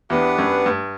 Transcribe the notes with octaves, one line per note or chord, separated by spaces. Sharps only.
E2 B3 D4 G4 B4 F#5
F#2
G2